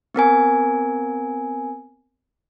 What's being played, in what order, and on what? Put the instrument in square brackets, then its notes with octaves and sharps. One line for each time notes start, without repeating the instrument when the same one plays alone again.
[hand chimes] B3 C4 A#4 G#5